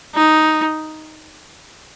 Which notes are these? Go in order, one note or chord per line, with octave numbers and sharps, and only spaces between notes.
D#4